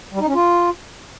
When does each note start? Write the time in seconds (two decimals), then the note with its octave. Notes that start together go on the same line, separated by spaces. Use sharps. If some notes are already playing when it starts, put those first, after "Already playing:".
0.13 G3
0.20 D#4
0.27 C#4
0.34 F4